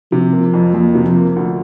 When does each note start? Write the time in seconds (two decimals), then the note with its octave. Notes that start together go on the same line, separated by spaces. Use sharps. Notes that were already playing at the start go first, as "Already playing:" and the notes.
0.11 C3 F3
0.33 A#3
0.54 F2
0.74 F2 A#3
0.95 C3
1.06 F3
1.16 A#3
1.36 D2